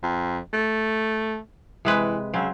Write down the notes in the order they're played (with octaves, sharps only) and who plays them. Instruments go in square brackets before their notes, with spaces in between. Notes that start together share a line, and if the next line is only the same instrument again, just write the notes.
[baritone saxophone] F2
A3
[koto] C3 G#3 B4 [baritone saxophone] E3
[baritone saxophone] C#3 [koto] F#3 C4